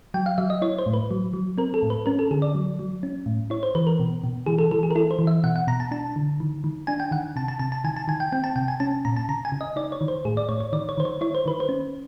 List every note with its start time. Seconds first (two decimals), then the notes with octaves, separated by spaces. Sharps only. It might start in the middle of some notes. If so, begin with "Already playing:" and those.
0.14 F#3 G5
0.26 F5
0.38 F#3 E5
0.50 D#5
0.62 E4 C#5
0.79 C5
0.86 A2
0.93 B4
1.11 F#3
1.34 F#3
1.58 C4 A#4
1.74 A4
1.83 A2
1.90 B4
2.06 C#4 A#4
2.19 A4
2.31 D3 G#4
2.42 D5
2.55 F#3
2.79 F#3
3.03 C#4
3.26 A2
3.50 E4 C#5
3.63 C5
3.75 E3 B4
3.87 A#4
4.00 B2
4.24 B2
4.46 E3 G#4
4.59 A4
4.71 E3 A4
4.83 G#4
4.91 A#4
4.95 E4 A4
5.11 C5
5.19 E3
5.27 E5
5.44 B2 F#5
5.56 F#5
5.67 B2 A#5
5.80 A5
5.91 D4 A5
6.16 D3
6.40 D#3
6.64 D#3
6.87 D4 G#5
7.00 G5
7.11 D#3 F#5
7.36 C3 A5
7.48 A5
7.59 C3 A5
7.72 A5
7.84 D#3 G#5
7.96 A5
8.08 D#3 G#5
8.20 G5
8.32 C4 G5
8.44 A5
8.56 C3 G5
8.68 G#5
8.80 C#4 A5
9.05 A#2 A#5
9.17 A5
9.29 C#3 A#5
9.45 G#5
9.52 C#3
9.61 D#5
9.76 D#4 D5
9.92 C#5
10.01 D#3
10.08 C5
10.25 A2 G#4
10.37 D5
10.49 A2 C#5
10.60 C#5
10.73 D#3 D5
10.89 C#5
10.97 D#3 C5
11.05 C#5
11.21 E4 C#5
11.35 C5
11.46 D#3 B4
11.60 C5
11.69 C#4